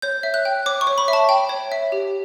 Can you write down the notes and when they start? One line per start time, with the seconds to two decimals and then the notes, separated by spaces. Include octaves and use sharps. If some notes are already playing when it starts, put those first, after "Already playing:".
0.02 C#5 G6
0.23 E5
0.34 F#6
0.45 G5
0.66 C#5 D6
0.81 C#6
0.87 C#5
0.98 B5
1.08 E5
1.13 A5
1.29 G5
1.49 C#5
1.72 E5
1.92 G4